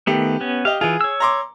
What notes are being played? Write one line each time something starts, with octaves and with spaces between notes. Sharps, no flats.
D#3 A3 B3 G4
B3 C#4
G4 D#5 F5
E3 F4 G#4
C#5 E6
A#5 C6 D6